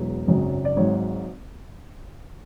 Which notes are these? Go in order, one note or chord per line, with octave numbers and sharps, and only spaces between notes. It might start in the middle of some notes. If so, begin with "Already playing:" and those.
Already playing: E1 E2 B2 F#3
G#1 F#2 C#3 F#3
D5
G#1 G#2 F#3 C#5